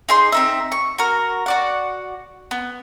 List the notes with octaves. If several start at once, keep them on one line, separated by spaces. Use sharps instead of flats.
D#4 G#4 C6
C4 D#4 E5
C#6
F#4 A#4
F#4 D5 F#5
B3